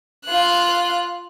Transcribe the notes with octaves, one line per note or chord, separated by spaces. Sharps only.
F4 F#6